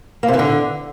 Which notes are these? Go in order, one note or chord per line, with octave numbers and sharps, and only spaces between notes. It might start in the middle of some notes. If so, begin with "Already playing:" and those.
A#3
C3
E3
D3